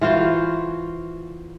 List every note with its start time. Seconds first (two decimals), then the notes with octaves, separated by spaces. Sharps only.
0.01 E3 F4 F#4 C5